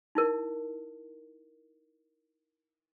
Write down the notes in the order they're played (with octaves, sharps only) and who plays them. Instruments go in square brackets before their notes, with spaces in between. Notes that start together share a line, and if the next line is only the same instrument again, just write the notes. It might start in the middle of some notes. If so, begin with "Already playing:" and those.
[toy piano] D#4 E4 A#4